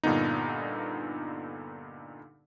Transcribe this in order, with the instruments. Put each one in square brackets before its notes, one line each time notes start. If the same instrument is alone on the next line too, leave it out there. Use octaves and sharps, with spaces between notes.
[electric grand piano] G2 A#2 D3 B3 D#4